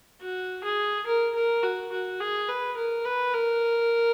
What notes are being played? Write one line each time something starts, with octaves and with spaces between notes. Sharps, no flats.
F#4
G#4
A#4
A#4
F#4
F#4
G#4
B4
A#4
B4
A#4